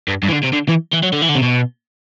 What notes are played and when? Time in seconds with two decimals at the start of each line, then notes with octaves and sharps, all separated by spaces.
0.08 G2
0.23 G2
0.28 E3
0.32 D3
0.43 C3
0.52 D3
0.68 E3
0.93 E3
1.03 F#3
1.13 D3
1.22 E3
1.29 D3
1.35 C3
1.42 B2